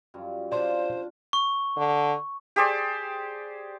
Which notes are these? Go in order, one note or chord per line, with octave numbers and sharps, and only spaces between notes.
F#2 F3 G3
D4 F4 C5 D5 C6
C#6
D3
G4 G#4 C5 D5